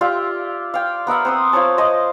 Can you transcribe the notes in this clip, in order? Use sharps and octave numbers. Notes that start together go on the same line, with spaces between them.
F4 G4 D5 E5
F5 G5
B3 A#4 E5 F#5
C4 C5 D#6
F4 C5 C#5 A5
C5 D#5 A5